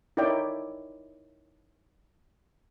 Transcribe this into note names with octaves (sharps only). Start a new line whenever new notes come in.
D#4 E4 A#4 C#5 D5 G5